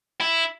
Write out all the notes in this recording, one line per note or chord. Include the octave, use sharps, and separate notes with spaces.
E4